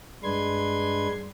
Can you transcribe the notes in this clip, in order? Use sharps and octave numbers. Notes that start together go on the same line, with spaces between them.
G2 G#3 D4 B4 C6 G#6